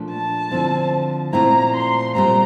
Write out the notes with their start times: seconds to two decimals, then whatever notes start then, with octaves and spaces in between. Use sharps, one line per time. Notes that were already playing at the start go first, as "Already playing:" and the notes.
Already playing: A#2 F3 A3 D4
0.10 A5
0.51 D3 F3 C4 E4
1.33 A#2 F3 A3 C4 E4 A#5
1.74 C6
2.15 A#2 G3 C4 A#5